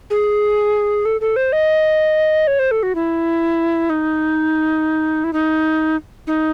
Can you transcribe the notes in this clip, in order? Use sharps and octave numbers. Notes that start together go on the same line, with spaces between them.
G#4
A4
A4
C5
D#5
C#5
C5
A4
F#4
E4
D#4
E4
D#4
D#4